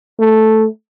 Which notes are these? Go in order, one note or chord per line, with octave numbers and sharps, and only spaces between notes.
A3